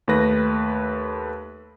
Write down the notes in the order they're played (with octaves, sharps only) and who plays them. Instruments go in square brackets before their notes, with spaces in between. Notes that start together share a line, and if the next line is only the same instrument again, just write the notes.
[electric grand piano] D#2 A3 B4 A#6